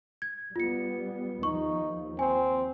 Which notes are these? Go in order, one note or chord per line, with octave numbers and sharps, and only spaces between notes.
G#6
G3 B3 F4 C#7
D#2 F3 D#4 C#6
C4 G#5